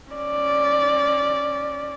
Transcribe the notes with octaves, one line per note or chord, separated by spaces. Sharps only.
C#4 D5